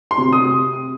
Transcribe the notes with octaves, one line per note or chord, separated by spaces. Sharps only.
C6
C3
D#6